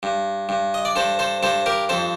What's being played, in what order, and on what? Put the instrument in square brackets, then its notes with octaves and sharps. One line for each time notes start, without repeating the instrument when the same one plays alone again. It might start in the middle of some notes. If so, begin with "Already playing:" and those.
[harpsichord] G2
G2
D#5
D5
G2 A4 C5
A4 C5
G2 A4 C5
G4 A#4
F2 A4 C5